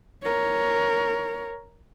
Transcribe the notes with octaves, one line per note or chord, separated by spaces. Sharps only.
A#4 C#5